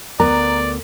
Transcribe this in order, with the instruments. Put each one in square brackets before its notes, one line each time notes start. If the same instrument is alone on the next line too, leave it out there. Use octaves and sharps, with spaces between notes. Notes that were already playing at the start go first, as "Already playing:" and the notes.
[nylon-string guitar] D2 B3 A#4 [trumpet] D5 [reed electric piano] A#5